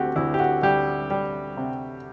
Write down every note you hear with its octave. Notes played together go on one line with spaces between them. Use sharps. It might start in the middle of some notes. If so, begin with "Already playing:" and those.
Already playing: D2 A3 C4 F#4 G4
D2 E4
G4
F#4
D2 G3 G4
G3
C3